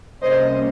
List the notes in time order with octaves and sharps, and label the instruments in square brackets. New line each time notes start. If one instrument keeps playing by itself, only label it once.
[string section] C2 C3 G3 A#3 C#4 C5 D#5